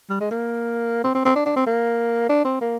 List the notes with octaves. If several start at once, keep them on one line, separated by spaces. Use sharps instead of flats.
G3
G#3
A#3
C4
C4
C4
D4
D4
C4
A#3
D4
C4
A#3